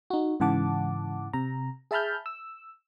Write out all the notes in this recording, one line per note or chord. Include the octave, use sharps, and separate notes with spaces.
D#4 F#4
G#2 C#3 E3 F#5 A5 D6
C3 A#5
G#4 E5 A5 B5 F6 G6
E6